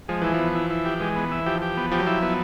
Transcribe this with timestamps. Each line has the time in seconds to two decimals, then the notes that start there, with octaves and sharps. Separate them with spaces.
0.08 F3 G#3
0.22 E3 E4
0.34 F3
0.39 B3
0.55 E4
0.70 E4
0.85 G4
1.00 E3 G#3
1.16 B3
1.32 E4
1.46 F3 G4
1.62 G4
1.77 B3
1.91 F3 G4
1.99 F#3
2.06 F3 E4
2.22 B3